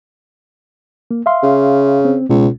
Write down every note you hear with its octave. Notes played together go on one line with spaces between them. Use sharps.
A#3
E5 F5 C6
C#3
C4
C#2 B2